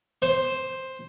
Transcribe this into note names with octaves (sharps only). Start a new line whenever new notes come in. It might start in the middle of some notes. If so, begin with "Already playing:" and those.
C5